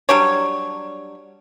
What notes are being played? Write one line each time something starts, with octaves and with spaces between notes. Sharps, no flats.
F#3 G3 D4 C#5